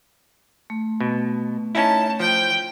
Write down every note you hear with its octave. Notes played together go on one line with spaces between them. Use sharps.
A3
B2
C#4 D#4 E4 A5
F3 G5